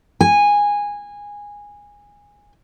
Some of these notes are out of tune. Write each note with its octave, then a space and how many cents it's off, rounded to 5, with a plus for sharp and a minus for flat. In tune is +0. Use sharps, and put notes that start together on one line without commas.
G#5 -15